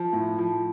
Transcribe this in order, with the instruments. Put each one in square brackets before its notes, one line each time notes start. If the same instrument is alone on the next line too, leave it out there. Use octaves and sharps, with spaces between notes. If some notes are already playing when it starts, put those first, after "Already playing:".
Already playing: [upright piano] F3
A2
F3